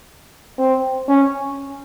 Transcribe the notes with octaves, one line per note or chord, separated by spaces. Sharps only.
C4
C#4